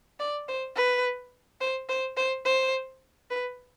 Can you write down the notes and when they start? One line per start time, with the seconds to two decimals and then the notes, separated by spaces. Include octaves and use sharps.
0.20 D5
0.48 C5
0.76 B4
1.61 C5
1.89 C5
2.17 C5
2.46 C5
3.30 B4